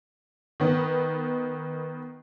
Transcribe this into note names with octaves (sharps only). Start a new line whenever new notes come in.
D#3 B3